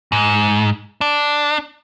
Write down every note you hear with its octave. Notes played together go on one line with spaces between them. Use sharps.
G#2
D4